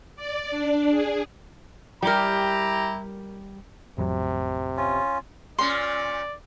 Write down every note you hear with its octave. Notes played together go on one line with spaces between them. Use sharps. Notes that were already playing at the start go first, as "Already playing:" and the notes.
D5
D4
G#4
G3 E4 G4 A#4 A#5
A1 F2 C3 F#3
C#4 F4
A#2 C#4 D5 C6